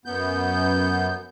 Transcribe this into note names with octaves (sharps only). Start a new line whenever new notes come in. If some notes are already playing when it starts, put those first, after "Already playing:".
F#2 B3 G6